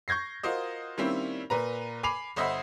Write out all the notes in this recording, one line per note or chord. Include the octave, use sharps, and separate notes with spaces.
C#6 G6 G#6 A#6 C7
F4 F#4 A#4 C5 D#5
D#3 G3 A#3 C4 C#4 E4
A#2 B4 A#5
G#5 B5 D6 C7 F7
G1 C5 D#5 E5 F#5 B5